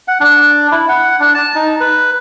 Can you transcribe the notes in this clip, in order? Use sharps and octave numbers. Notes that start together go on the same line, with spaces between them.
F#5
D4
E4
F#5
D4
A5
D#4
B4